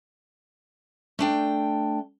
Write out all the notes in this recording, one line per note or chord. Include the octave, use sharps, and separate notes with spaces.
A3 D4 G5